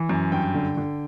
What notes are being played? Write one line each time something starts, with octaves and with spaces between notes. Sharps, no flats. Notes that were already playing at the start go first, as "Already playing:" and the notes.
Already playing: E3
F#2
G2 G5
D3
D3